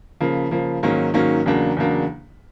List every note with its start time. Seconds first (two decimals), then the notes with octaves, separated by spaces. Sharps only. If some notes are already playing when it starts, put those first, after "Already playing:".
0.21 C#3 F3 A#3
0.51 C#3 F3 A#3
0.83 G#2 D#3 F#3 A#3 C#4
1.14 G#2 D#3 F#3 A#3 C#4
1.46 E2 C#3 F#3 A#3 D4
1.77 E2 C#3 F#3 A#3 D4